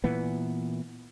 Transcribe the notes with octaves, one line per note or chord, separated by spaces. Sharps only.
A#2 E3 B3